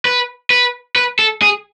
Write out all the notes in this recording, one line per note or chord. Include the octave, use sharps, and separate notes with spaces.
B4
B4
B4
A4
G#4